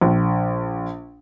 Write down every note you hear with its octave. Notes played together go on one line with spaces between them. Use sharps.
A#1